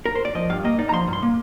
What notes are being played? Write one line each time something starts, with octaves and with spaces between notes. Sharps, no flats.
A#4
C5
D5
F3 D#5
G2 F5
A#3 D#5
D#4 D5
A#5
F3 C6
G2
C6
A#3